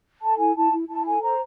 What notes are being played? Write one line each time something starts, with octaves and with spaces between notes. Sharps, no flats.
A4 A5
E4 G#5
E4 A5
E4
E4 A5
A4 G#5
C5 A#5